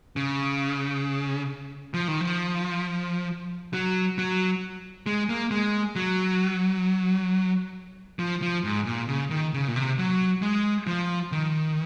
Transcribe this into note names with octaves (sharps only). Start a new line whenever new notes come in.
C#3
F3
D#3
F3
F#3
F#3
G#3
A#3
G#3
F#3
F3
F3
G#2
A#2
C#3
D#3
C#3
A#2
C3
F#3
G#3
F3
D#3